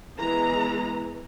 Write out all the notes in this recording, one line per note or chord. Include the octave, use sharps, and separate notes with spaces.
E3 G#3 B3 A#5